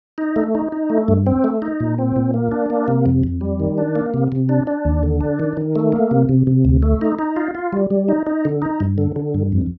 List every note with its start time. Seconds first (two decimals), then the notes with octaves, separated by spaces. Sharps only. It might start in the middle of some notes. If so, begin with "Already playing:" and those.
0.18 D#4
0.36 A3
0.55 D#4
0.72 D#4
0.90 A3
1.08 G2
1.27 C4
1.44 A3
1.62 D#4
1.80 A#2
1.98 C4
2.16 A#2
2.34 A#3
2.52 D4
2.70 A#3
2.88 C3
3.06 F2
3.23 F2
3.41 G3
3.60 D#3
3.78 D4
3.96 A#3
4.14 C3
4.32 C3
4.49 D4
4.67 D4
4.85 D#2
5.03 D3
5.21 D4
5.40 D#3
5.57 D#3
5.76 A3
5.92 A#3
6.11 C3
6.29 C3
6.47 C3
6.65 D2
6.83 A3
7.01 D#4
7.19 D#4
7.36 F4
7.55 F4
7.73 G3
7.90 G3
8.08 D#4
8.27 D#4
8.45 D3
8.62 D#4
8.80 G2
8.98 D3
9.16 D3
9.34 G2
9.52 F2